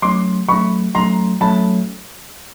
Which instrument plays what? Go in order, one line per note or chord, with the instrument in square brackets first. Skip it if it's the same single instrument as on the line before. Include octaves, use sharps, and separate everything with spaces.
[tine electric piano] F#3 A3 C#4 [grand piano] C6 D6
[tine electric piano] F#3 A3 C#4 [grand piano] B5 C#6
[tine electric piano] F#3 A3 C#4 [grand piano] A#5 C6
[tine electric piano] F#3 A3 C#4 [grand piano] A5 B5